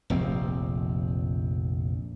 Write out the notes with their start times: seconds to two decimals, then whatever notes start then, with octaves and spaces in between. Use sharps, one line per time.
0.10 F1 A#1 C4